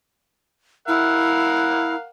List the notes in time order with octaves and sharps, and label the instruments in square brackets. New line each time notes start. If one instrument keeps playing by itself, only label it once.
[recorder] E4 [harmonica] A#4 F5 F#5